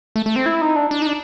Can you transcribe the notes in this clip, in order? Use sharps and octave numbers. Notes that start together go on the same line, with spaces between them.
A3
A3
C4
E4
D#4
D4
D4
D#4
D4